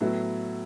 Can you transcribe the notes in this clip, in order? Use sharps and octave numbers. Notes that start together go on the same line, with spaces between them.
A2 F#3 B3 E4